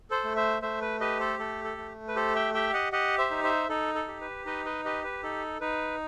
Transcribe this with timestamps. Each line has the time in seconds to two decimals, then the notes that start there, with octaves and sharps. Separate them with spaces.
0.10 A4 C5
0.24 A3
0.36 C5 E5
0.62 A3 C5 E5
0.81 B4
1.00 G4 B4 D#5
1.20 A4 C5
1.39 A3 A4
1.64 A4
1.77 A3
2.08 B4
2.16 G4 A4 C5
2.35 E5 G5
2.54 G4 E5 G5
2.73 D#5 F#5
2.92 G4 D#5 F#5
3.18 C5 E5
3.31 D#4
3.43 C5 E5
3.69 D#4 A4
3.95 A4
4.08 G4
4.21 B4
4.46 D#4 B4 D#5
4.65 B4 D#5
4.85 G4 B4 D#5
5.04 B4
5.23 D#4 A4
5.61 D#4 B4